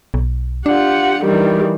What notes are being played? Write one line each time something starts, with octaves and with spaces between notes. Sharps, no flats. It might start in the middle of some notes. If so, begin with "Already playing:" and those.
B1
D4 F4 G4 F#5
D#3 E3 G3